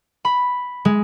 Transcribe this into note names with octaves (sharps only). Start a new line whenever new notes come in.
B5
G#3